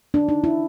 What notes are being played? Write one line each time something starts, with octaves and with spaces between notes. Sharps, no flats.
D4
D#4
E4